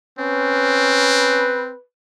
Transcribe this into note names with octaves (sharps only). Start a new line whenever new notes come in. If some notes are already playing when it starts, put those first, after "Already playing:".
C4 C#4 B4